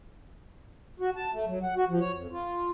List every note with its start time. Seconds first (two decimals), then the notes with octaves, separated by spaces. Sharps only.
1.00 F#4
1.16 A5
1.32 A3
1.47 F#3
1.63 F#5
1.76 F#4
1.88 F3
2.00 C#5
2.15 F2
2.31 F4